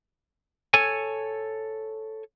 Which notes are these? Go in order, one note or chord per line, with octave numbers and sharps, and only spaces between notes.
A4 C#5 G#5